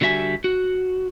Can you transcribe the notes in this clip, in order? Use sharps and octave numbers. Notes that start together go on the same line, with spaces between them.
D3 G3 F#4 E5 G#5
F#4